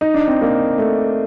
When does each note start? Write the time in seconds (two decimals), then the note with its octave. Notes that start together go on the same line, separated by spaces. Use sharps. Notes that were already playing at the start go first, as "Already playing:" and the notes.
0.01 D#4
0.14 D4
0.28 C4
0.42 A#3
0.78 A3